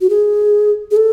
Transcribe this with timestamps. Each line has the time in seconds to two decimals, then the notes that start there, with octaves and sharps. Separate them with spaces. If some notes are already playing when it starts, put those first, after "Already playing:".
0.01 F#4
0.10 G#4
0.91 G#4
0.97 A4